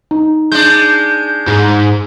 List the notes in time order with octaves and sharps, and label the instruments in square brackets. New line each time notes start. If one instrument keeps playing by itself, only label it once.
[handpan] D#4
[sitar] G#3 D4 [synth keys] G6
[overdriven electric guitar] G#2